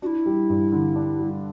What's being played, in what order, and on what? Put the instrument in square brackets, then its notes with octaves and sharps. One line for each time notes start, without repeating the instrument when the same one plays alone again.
[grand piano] D4 [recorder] F#4
[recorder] E4
[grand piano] G3
G2
D3
D4
G3